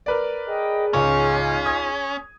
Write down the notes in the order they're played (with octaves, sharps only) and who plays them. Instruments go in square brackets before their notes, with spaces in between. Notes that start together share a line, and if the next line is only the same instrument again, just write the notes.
[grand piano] A#4 B4 D5
[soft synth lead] G#4 [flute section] D#5 G5
[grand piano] C#2 G#2 C#5 [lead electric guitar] C#4 [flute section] D#4 F4
[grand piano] D#6 G#6